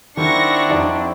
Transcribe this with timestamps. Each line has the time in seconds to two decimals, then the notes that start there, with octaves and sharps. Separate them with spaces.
0.17 D#3 C4 D4 E4 F#4 C#6 A#6
0.69 F2 D#4 D5